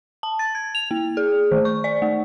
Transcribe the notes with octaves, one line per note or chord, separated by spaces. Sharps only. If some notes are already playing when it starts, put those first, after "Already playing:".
A5
A6
G#6
F7
A#3
G#4
D#3
C#6
D5
A3